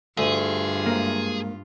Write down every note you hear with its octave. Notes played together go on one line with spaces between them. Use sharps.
D2 G2 F4 G#4
G#2 A#3